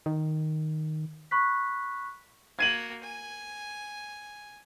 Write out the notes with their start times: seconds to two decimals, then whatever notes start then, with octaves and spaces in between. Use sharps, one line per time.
0.06 D#3
1.31 B5 C#6 F#6 B6
2.59 A#3 F#4 G#6 D#7 F#7
3.03 G#5